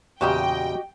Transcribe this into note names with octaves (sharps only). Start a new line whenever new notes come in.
E2 A#2 C#3 F#4 G4 D#5 G5